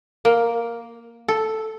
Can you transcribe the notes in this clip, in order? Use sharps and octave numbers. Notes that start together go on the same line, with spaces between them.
A#3
A4